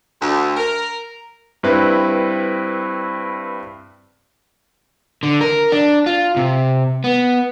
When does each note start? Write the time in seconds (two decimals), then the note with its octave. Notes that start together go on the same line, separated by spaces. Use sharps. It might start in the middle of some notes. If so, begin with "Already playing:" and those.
0.21 D2
0.57 A#4
1.63 G2 C4 E4 B4
5.23 D3
5.41 A#4
5.72 D4
6.06 F4
6.37 C3
7.04 B3